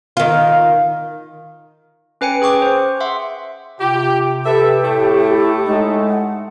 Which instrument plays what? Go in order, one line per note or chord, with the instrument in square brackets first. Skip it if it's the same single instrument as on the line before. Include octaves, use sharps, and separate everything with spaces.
[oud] D#3 F4
[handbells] C#4 B4 G5 G#5 C#7
G#4 G5 C#6 D6
C5
E5 F#5 C6
[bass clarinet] C3 [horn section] F4 G4
[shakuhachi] G4 [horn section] A4 B4 E5
[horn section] A2 A3
[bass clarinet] E4
[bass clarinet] G#3 [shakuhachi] D#4
[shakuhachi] F#5